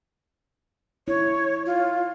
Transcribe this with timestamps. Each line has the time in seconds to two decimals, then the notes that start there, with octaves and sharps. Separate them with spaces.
1.08 E4 C#5
1.66 F4